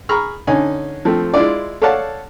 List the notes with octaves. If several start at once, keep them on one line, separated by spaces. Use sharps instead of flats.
G#4 A#5 B5 C#6 F6
D3 C#4 D#4 G#5
F3 A3 C4
G#3 E4 F4 D5
A4 C#5 D5 F5 F#5 A5